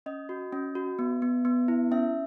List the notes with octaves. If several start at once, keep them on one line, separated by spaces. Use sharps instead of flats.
C#4 D#5
F#4
C#4
F#4
B3
B3
B3
E4
C#4 E5